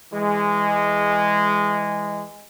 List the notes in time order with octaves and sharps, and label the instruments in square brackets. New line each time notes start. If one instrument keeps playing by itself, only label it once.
[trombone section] E3 G#3